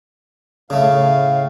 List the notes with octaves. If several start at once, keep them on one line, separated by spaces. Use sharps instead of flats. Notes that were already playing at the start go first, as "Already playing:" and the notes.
A2 C#3 A3 F5